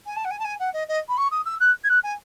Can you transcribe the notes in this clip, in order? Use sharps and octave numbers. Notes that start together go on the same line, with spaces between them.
G#5
A5
F#5
G#5
A5
G#5
F#5
D#5
D#5
B5
C#6
D#6
E6
F#6
G#6
F#6
G#5